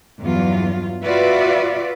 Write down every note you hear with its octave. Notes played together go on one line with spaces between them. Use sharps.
E2 G2 F#3 F4
F4 F#4 B4 D5 E5